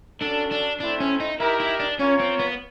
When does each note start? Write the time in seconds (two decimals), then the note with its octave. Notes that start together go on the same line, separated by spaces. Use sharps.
0.20 C#4 D4 F#4 A4
0.51 D4
0.80 A3 C4 D4 E4
1.00 C#4
1.20 D#4
1.40 D#4 E4 G4 A#4
1.60 E4
1.80 D4
1.99 C#4 F4 A#4 C#5
2.20 C4
2.40 B3